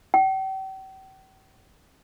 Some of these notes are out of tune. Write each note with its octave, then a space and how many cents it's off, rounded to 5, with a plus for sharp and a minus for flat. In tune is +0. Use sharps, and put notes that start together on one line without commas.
G5 -40